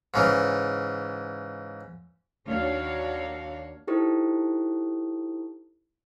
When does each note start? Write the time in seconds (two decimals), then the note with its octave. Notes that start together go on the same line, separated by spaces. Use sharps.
0.14 G#2 C#3 E3
2.46 D#2 A#3 D4 F#4 C#5 F5
3.87 D#4 E4 G4 A4 C5